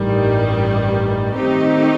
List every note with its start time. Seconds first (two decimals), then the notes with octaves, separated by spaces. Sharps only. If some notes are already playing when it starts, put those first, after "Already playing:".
Already playing: A1 G2 D#3 G3
1.34 D#3 A3 C4 D#4 G4